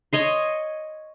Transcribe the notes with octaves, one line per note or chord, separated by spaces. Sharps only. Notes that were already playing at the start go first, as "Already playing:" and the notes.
C#5 D#5 C6